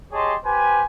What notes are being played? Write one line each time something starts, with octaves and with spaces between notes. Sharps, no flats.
G4 G#4 C#5 D#5 A5 C6
G4 B4 C5 G#5